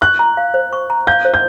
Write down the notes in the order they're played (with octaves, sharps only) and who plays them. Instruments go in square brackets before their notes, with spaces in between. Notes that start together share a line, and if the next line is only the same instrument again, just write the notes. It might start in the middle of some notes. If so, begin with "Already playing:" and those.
[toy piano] C#6 [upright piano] F#6
[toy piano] A#5
F5
C5
C#6
A#5
[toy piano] F5 [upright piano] G6
[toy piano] C5
[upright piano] G6